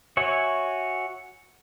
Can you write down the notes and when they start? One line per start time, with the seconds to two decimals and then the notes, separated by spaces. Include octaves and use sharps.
0.17 F#4 C#5 E5 G#5